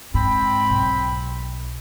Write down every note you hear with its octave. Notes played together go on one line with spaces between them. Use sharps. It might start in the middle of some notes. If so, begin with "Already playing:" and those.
G#2 C4 G5 B5
B1